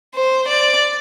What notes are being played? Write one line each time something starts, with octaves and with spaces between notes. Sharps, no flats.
C5
D5